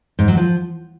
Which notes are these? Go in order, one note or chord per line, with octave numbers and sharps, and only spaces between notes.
G#2
F#3
F3